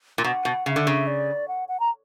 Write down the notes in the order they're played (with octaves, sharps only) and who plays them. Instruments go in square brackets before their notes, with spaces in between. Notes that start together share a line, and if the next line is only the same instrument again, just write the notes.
[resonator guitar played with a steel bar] A#2
[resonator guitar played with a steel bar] B2 [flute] F#5
[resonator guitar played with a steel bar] B2
[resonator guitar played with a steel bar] C#3 [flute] F#5
[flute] E5
[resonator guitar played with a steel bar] D3
C#3
[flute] D5
F#5
F#5
A#5